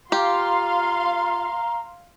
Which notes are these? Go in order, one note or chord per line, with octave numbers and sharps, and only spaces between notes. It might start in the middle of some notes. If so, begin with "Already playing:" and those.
F4 G4 F5 A#5 C6